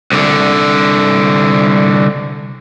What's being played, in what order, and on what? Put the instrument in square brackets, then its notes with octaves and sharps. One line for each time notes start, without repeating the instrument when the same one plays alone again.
[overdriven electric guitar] C2 D3